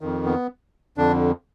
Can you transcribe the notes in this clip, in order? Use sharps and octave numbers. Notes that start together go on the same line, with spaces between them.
F2 D#3
B3
F2 D3 D4